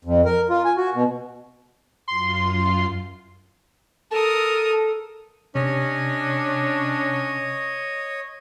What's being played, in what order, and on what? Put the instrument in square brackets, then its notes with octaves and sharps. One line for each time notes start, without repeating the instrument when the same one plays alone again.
[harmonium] F2
A#4
F4
G#5
F#4
B2
[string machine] F#2 F4 [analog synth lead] C6
[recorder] A4 [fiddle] A#4 D#6 [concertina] A5
[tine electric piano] C3 [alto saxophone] C#4 [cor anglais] D4 [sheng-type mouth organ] C#5 D#5